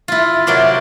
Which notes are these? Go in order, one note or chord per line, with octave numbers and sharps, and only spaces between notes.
E4 F4
C3 F#3 A#4 C5 D5